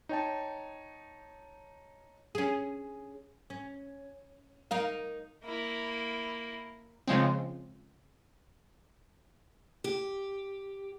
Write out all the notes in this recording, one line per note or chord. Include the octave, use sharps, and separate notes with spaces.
D#4 C#5 G5 A5
C#4 G#4
C#4
D#4 A#4 F5
A#3 E4
C#3 F3 G#3 C4
G4